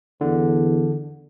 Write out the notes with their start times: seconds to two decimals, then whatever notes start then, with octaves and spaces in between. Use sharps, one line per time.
0.21 E2 D3